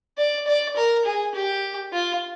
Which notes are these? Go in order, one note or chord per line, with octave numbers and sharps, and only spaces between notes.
D5
D5
A#4
G#4
G4
F4